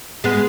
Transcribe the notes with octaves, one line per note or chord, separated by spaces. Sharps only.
G#3 B3